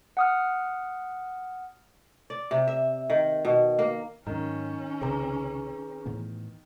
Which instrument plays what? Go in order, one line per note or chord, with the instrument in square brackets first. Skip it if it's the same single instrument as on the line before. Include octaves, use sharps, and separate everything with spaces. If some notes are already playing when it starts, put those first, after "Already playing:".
[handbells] F#5 D#6 F6
[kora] D5
C3
E5
D#3
B2
A#3
[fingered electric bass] G#2 F#3 [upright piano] D#3 [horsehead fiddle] C#4 [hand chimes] A#5
[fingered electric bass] C2 C#3 [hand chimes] G#4 B4 A#5
[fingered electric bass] A2 E3 B3